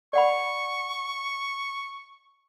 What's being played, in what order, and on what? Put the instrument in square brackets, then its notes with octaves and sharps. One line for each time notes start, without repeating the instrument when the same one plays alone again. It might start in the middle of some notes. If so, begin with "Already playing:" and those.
[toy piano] D5 F#5 B5 [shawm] C#6